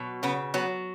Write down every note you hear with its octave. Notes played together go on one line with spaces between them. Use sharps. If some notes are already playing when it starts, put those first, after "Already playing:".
Already playing: B2 F#3
C#3 B3
F#3 B3